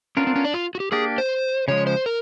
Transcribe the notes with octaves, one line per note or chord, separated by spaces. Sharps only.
B3 C#4 D4 F4 A#4
C4
C#4
D4
F4
F#4
G4
A#3 D4 G4 G#4
C5
C#3 F3 G#3 C#5
C5
A#4